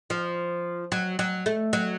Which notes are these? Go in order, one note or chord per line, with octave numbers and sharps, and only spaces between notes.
F3
F#3
F#3
A3
F#3